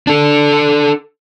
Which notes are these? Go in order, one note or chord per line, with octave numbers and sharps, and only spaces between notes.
D4 A4